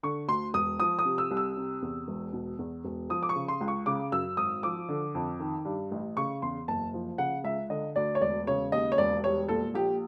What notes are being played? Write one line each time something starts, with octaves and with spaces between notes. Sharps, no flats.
D3 C#6
D2 C6
E1 D#6
F3 D#6
D#6
C3
E6
C2
E6
C3
E2
E1
B2
E2
E1
F3 D#6
D6
C#6
C#3
C6
C#2
C#6
C#3 D6
F#2 E6
G#1 D#6
F3 D6
D3
F2
D#3
G2
A1
C#3 C#6
E2 C6
F#1 A5
F3
C#3 F#5
C#2 E5
D3 D#5
D2 D5
C#5
E1 D5
C#3 C#5
D#2 D#5
C#5
E1 D5
G3 C#5
A#2 A4
A#1 G4